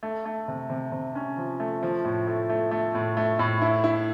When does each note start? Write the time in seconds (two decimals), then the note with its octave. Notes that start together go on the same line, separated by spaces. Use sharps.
0.03 A3
0.25 A3
0.48 C3
0.70 C3
0.92 C3
1.15 C#4
1.37 F3
1.60 A3
1.83 F3
2.05 A2
2.27 A3
2.50 A3
2.71 A3
2.95 A2
3.17 A3
3.39 A2
3.62 E4
3.84 E4